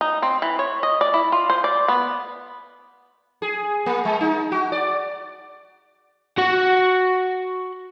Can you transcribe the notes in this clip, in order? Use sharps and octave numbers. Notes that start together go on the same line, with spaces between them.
D#4
C4
E3
C#5
D#5
D5
E4
F4
C5
D5
B3
G#4
A#3
G#3
D#4
F#4
D5
F#4 F#5